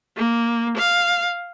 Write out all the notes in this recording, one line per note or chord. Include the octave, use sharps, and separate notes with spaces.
A#3
F5